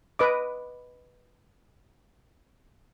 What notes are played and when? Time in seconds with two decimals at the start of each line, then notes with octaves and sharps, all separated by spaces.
0.19 B4 D#5 D6